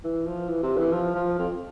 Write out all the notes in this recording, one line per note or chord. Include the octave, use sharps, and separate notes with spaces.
E3
F3
E3
C3
E3
F3
F3
F2